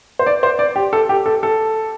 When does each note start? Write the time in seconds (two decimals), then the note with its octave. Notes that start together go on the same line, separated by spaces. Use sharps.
0.19 C5
0.26 D5
0.43 C5
0.59 D5
0.76 G4
0.93 A4
1.09 G4
1.26 A4
1.43 A4